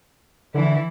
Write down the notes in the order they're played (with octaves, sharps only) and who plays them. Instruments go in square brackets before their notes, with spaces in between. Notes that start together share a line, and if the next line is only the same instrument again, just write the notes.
[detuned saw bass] D3 [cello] E3 E4